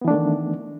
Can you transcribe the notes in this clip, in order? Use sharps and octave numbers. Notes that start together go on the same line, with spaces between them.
D#3 E3 A3 B3 D4